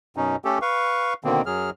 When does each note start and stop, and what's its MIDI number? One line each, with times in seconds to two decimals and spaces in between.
0.17 0.36 42
0.17 0.36 47
0.17 0.36 61
0.17 0.36 63
0.45 0.59 57
0.45 0.59 61
0.45 0.59 67
0.45 0.59 69
0.62 1.14 71
0.62 1.14 77
0.62 1.14 85
1.24 1.42 47
1.24 1.42 50
1.24 1.42 51
1.24 1.42 58
1.24 1.42 60
1.46 1.70 42
1.46 1.70 54
1.46 1.70 68
1.46 1.70 89